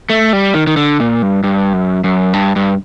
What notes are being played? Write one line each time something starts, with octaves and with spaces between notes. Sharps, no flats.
A3
G3
D#3
D#3
D3
A#2
G2
G2
F#2
F#2
G2
G2